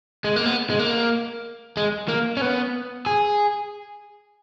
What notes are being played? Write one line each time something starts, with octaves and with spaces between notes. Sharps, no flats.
G#3
A#3
B3
G#3
A#3
G#3
A#3
C#4
B3
G#4